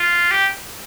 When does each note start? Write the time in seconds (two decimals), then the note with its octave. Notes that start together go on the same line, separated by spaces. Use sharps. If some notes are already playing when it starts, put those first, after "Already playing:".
Already playing: F4
0.31 G4